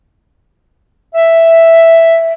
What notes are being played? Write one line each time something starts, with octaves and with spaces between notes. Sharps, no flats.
E5